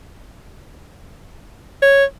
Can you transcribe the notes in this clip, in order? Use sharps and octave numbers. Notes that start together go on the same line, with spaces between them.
C#5